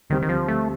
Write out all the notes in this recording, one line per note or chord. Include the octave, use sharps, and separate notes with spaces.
D2 D3 D#3 G3 C4 G4
D#3
F3
A3